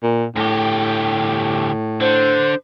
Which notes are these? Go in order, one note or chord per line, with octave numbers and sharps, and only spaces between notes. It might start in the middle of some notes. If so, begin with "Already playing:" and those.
A#2
D2 A2 G4
D3 C5